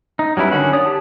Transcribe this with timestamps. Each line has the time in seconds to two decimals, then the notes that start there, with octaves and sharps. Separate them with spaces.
0.19 D#4
0.37 F#3 G3 C#4 E4 B4
0.51 D3 D#3 C#4 F#4 F#5
0.73 C#5 D5 D#6
0.86 G4 A5